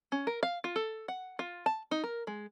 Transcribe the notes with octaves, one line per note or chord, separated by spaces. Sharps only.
C#4
A#4
F5
F4
A4
F#5
F4
A5
D#4
A#4
G#3